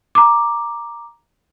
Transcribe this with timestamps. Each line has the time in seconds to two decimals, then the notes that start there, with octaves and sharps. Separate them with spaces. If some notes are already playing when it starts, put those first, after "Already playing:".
0.15 A#5 D6